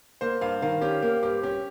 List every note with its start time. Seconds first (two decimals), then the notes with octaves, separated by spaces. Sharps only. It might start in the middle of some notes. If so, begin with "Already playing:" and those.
0.21 A#3 C5
0.41 G2 F5
0.62 D#3 F5
0.82 C#4 G4
1.02 A#3 G4
1.23 G2 G4
1.43 C#4 G4